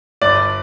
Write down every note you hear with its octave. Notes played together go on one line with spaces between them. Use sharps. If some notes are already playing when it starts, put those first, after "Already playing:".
G1 D5